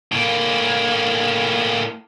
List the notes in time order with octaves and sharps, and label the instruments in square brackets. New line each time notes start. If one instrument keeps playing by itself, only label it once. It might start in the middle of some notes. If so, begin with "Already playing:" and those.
[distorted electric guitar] A2 A#3